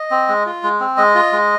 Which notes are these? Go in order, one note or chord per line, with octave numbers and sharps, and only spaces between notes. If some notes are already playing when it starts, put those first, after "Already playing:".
Already playing: D#5
C4
G#3
F4
G#3
C4
G#3 D#5
F4
G#3